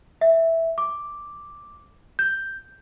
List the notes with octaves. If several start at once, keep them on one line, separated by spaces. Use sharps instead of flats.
E5
D6
G6